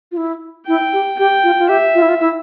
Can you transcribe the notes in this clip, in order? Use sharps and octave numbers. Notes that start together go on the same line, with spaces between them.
F4
E4
E4 G5
G4
G4 G5
F4
F4
G4 E5
F4
E4
F4
E4